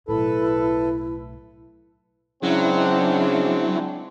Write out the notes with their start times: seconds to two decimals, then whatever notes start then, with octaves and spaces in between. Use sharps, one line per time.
0.08 B1 A2 E4 A4 B4
2.43 C#3 F#3 G#3 C4 D4 E4